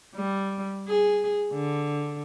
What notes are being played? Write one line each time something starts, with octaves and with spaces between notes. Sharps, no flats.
G3
G#4
D3